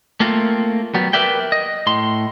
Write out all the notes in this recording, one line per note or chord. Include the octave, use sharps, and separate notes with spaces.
A3 A#3 C4 F4
F#3 G3 B3
A#4 B4 D5 E5 G5
D#5
A2 C6